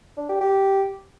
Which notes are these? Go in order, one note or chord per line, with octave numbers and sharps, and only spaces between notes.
D4
G4
G4